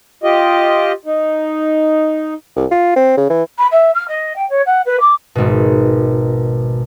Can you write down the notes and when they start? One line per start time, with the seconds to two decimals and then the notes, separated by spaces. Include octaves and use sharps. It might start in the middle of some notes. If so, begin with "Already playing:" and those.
0.24 F4 G4 D#5
1.05 D#4
2.56 C2
2.71 F4
2.96 C4
3.17 C#3
3.30 E3
3.58 B5
3.71 E5
3.94 F6
4.08 D#5
4.35 G5
4.49 C#5
4.66 F#5
4.86 B4
5.00 D6
5.35 G#1 B2